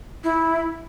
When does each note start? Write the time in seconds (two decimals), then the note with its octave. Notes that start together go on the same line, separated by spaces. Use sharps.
0.24 E4